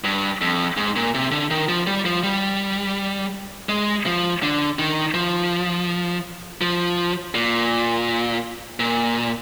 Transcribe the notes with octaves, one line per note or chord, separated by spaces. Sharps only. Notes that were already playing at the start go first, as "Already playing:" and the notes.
G2
F2
G#2
A#2
C3
D3
D#3
F3
G3
F3
G3
G#3
F3
D3
D#3
F3
F3
A#2
A#2